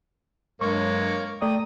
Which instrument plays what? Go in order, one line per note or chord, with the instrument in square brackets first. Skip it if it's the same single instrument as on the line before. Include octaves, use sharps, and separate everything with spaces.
[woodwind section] G2 F#3 G#3 [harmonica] A#3 C#5 [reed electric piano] C#6
[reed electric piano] A3 D5 [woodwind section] G5 A#5 D#6